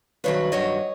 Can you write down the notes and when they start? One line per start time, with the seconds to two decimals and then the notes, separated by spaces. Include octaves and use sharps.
0.24 G2 D#3 F#3 B4 C#5
0.52 G2 D#3 F#3 C#5 D#5